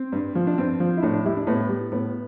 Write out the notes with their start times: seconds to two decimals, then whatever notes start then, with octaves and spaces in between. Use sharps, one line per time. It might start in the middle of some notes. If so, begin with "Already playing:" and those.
Already playing: C4
0.12 G2
0.35 F3
0.47 D4
0.58 G2 C4
0.80 F3
0.97 E4
1.03 A2 D4
1.14 D4
1.25 G3 E4
1.37 D4
1.47 A2 B3
1.69 G3
1.92 A2 B3